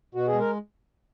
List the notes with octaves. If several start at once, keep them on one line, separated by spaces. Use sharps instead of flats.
B2 F#4
G#4
G#3
A#4